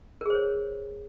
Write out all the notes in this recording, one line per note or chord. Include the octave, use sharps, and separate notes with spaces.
G#4 A#4 C5 C#5